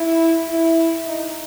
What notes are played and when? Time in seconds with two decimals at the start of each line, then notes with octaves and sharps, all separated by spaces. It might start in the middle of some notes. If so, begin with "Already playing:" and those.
Already playing: E4
0.49 E4
1.05 D#4